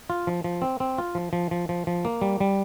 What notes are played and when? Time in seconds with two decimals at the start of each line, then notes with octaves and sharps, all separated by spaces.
0.10 F4
0.27 F3
0.44 F3
0.62 C4
0.80 C4
0.98 F4
1.15 F3
1.33 F3
1.51 F3
1.69 F3
1.87 F3
2.05 A#3
2.21 G3
2.40 G3